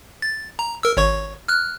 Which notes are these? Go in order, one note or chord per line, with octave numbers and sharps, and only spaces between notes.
A6
A#5
A#4 E6
G#1 C#5 C#6
F6 F#6